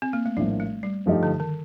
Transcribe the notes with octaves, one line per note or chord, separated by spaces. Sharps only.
C4
A#3
A3
A#1 A2 F3 G3 A#3
A3
G3
G2 F3 A3 D#4 G4
D3
D#3